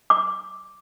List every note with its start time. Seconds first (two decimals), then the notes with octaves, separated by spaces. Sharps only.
0.10 D6